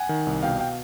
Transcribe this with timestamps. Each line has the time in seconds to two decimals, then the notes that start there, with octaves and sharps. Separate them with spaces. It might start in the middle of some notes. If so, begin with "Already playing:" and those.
Already playing: F#5 G#5
0.09 D#3
0.27 C2
0.43 B2 F5 G5
0.60 F5 G5